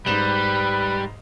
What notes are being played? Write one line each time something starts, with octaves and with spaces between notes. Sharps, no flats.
G#2 G3 B4 E7 F#7